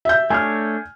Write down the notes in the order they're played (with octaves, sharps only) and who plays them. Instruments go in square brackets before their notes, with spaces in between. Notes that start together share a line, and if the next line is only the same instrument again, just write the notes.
[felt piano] E5 G6
[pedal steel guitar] A3 D4 C#5 [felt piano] G#5 F6